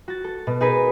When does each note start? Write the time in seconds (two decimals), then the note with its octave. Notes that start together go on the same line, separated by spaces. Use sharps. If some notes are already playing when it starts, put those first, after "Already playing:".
0.08 F#4 A6
0.24 A4
0.47 B2
0.60 D#4 G#4 A#4 B4